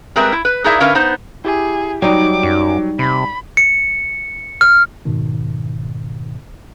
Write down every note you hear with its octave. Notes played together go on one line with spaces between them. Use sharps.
G3 G#3 C4 A#4 B4 E5
E4
B4
D#4 E4 G#4 A#4 D5 E5
D3 C#4 A#4 B4 E5 F5
B3 D#4 C5
E4 G4 G#4
F#3 G3 D#4 G5 D6
F#2
C3 B5
C#7
F6
F2 G#2 B2 D#3